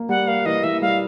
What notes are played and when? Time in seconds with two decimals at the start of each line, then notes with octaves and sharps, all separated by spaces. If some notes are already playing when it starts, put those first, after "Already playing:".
Already playing: A#3
0.09 G3 F#5
0.27 A#3 F5
0.46 E3 D#5
0.64 E3 E5
0.82 G3 F5